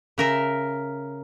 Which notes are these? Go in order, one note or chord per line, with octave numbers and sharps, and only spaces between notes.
C#3 A#4 E5